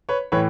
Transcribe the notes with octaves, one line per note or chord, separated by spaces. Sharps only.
B4 C#5
A2 E3 B4 C#5